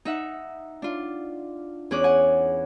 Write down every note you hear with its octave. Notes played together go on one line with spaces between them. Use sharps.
D#4 E5 F#5
D4 F4
E2 C#4 G#4 D6 F#6
F#5 G#5